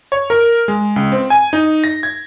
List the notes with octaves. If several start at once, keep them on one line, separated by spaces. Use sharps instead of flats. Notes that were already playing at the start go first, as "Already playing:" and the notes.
C#5
A#4
G#3
C#2
C4
G#5
D#4
A#6
G#6